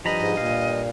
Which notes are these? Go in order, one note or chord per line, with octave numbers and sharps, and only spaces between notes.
G2 F3 D#5 A#5 B5
G#2
A#2 F5